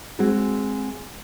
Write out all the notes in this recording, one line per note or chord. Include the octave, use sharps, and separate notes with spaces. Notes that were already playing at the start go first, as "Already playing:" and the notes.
G#3 C4 F#4 G#4